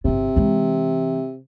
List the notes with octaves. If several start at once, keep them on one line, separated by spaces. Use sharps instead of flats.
G1 C3 B3
E3 G#3